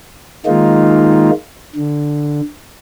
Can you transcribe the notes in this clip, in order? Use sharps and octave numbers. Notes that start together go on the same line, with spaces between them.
D#3 G#3 A#3 D#4 F4
D3